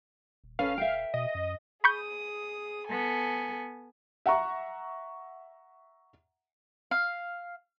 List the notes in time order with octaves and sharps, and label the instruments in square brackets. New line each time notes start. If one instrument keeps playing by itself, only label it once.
[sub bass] D#1
[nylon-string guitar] C#4 A4 B4 [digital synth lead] F5
[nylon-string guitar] E5 G5
[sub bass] B2 [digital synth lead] D#5
[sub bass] F#2
[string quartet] G#4 D#6 [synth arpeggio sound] B5 C#6 G6
[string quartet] B3 A4 G#5
[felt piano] E5 F#5 A#5 C#6
[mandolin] F5